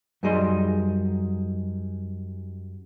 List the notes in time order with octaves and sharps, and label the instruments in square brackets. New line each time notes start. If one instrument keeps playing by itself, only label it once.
[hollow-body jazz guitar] F#2 G3 D#4 G#4 D#5 C6